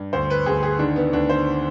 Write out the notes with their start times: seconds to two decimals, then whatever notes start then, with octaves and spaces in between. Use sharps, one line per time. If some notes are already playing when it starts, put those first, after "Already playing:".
Already playing: G2
0.13 D2 C5
0.30 B4
0.46 D2 G#4
0.63 G#4
0.79 D#3 D4
0.96 B3
1.13 D2 D4
1.29 C5